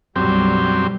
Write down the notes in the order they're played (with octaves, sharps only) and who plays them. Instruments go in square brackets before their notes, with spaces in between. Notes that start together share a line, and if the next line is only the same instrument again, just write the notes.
[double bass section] B1 G3 [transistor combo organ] F#2 C4 G4